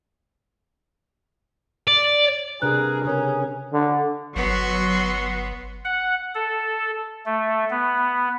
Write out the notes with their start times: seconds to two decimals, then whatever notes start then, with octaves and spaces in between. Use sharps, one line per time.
1.87 D5
2.62 C3 D4 G#4 A#4 B4 F#6
3.05 C#3 C#4 G#4 A#4
3.73 D3
4.36 G1 F#3 B3 F#4 C6 C#6
5.85 F#5
6.35 A4
7.26 A3
7.71 B3